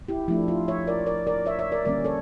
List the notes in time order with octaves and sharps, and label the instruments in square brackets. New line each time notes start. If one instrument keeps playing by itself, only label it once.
[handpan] E4 G4
F3 A3 D4 E4
F4
C#5 E5
A#4 D5
A#4 D5
A#4 D5
C#5 E5
C#5 E5
A#4 D5
D3 G3 A#3 C#4 A#4 D5
A4 C#5